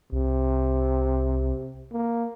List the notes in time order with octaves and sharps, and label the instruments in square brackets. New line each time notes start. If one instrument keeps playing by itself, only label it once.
[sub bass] C2 [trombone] C3
[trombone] A#3